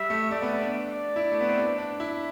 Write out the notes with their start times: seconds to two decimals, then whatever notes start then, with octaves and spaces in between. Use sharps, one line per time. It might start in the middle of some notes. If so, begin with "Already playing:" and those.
Already playing: G3 E5
0.10 A3
0.31 A3 D5
0.42 B3
0.52 B3
0.62 D4
0.74 D5
1.16 E4
1.32 A3
1.41 B3
1.49 C4
1.58 D4
1.78 D4
2.00 E4 E5